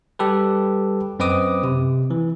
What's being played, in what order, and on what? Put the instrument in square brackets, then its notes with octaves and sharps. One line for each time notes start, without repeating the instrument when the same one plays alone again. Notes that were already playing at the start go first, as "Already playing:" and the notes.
[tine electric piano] G3 G4 A4 B4
F#2 C4 B4 D#5 D6 D#6
C3
E3